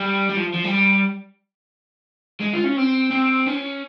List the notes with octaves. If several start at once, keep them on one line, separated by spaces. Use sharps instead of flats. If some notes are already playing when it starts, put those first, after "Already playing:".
Already playing: G3
G3
F3
F3
G3
G#3
F4
C#4
C4
C4
C#4